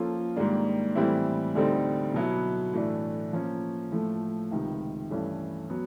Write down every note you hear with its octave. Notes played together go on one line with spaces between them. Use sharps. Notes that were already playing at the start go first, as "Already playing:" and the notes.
Already playing: F3 A#3 C#4 F4 A4
G#2 D#3 G3 A#3 D4
A2 E3 G3 C4 E4
D2 D3 G3 C4 D#4
B2 F#3 B3 E4
A2 E3 A3 D4
F3 A#3 C#4
A2 F3 A3
C#2 C3 D#3
G2 E3 A3 C#4
F#3 B3